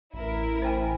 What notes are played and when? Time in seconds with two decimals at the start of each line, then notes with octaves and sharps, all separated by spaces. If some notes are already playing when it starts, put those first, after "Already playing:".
0.13 A1 E4 A#4
0.62 C5 G5 G#5